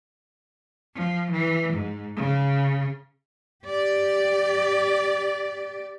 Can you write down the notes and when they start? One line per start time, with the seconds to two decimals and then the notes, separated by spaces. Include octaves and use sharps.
0.94 F3
1.31 E3
1.73 G#2
2.16 C#3
3.65 G4 D5